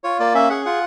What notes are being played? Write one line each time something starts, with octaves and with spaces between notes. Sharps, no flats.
F4 C#5
A#3 D5
C#4 E5
G#4 F#5
F4 F#5